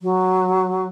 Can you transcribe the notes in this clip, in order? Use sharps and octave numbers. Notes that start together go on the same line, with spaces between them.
F#3